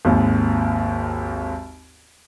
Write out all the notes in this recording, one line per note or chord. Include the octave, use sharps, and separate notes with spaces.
G#1 D#2